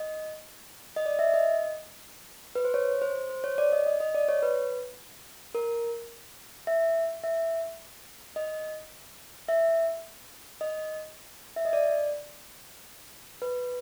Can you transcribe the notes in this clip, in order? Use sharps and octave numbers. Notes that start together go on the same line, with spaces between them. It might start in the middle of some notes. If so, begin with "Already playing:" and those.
Already playing: D#5
D#5
D5
E5
D#5
B4
C5
C#5
C5
C5
C#5
D5
D#5
D#5
D#5
D5
C#5
B4
A#4
E5
E5
D#5
E5
D#5
E5
D#5
D5
B4